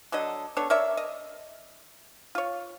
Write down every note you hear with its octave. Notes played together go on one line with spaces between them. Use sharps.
D3 F#3 A4 D#5
B3 D4 A4 C#5
A#4 C#5 D5 E5
D#5
F4 C#5